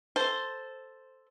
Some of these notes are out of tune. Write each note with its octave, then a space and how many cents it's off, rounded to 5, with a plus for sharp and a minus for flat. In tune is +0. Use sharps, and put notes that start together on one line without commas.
A4 +0 C5 +0